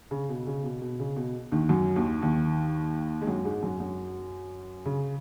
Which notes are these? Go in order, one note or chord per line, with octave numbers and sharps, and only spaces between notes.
C#3
B2
C#3
B2
B2
C#3
B2
D#2 D#3
F#2 F#3
D#2 D#3
D#2 D#3
G#3
F#2 F#3
G#2 G#3
F#2 F#3
F#2 F#3
C#3